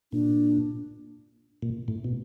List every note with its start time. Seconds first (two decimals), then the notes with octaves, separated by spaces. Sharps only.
0.12 A#2 D4
1.62 A#2
1.88 A2
2.04 B2